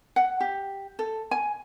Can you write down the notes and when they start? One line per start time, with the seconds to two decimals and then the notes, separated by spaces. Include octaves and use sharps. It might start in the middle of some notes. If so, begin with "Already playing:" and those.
0.16 F#5
0.40 G4
0.99 A4
1.31 G#5